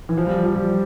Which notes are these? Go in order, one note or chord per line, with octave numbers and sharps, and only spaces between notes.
E3
F3
G3
F3
G3